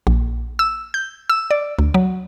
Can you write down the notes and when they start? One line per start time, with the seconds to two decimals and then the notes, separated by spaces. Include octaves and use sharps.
0.07 A#1
0.59 E6
0.94 G6
1.30 E6
1.51 D5
1.79 D2
1.94 F#3